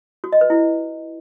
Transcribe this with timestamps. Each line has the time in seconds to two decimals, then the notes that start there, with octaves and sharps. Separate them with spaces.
0.24 F#4
0.32 D#5
0.41 B4
0.50 E4